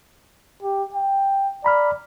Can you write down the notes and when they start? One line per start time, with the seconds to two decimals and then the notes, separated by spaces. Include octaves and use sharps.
0.62 G4
0.95 G5
1.64 D5 A#5 B5 F6